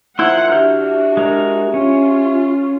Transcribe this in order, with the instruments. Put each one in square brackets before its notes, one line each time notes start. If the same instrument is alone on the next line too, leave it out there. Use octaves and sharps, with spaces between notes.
[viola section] D#3 F3 F#5 [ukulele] E4 [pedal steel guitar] C6 E6 G6
[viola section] D4 F#4 [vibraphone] G4 E5 [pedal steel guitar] F6 G6
[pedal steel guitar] G#3 A#4
[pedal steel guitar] C#4 [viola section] F4